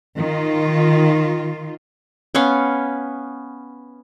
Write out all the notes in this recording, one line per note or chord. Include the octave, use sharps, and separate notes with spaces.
D#3 F4
B3 C#4 C#5 F5